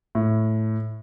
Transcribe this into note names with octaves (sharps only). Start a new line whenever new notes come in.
A2